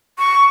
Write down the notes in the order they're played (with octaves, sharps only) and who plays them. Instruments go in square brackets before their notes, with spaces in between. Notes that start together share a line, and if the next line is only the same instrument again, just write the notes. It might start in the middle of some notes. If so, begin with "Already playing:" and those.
[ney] C#6